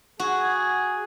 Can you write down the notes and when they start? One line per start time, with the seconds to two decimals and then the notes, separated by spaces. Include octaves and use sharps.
0.19 F#4 G#4